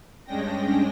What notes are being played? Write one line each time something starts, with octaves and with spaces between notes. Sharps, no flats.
G2 G#3 C#4 D4 G5 A#6